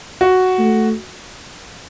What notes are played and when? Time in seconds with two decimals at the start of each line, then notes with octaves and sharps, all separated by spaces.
0.21 F#4
0.59 A3